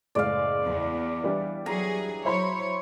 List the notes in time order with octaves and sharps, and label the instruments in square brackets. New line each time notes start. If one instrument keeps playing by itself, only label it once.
[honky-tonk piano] F#1 A2 G#3 [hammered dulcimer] D5 F5
[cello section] E2
[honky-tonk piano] E3 G3 D4
[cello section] F#3 G#4 [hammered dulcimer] A#5
[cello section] F#3 C#5 [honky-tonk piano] E4 C5 B5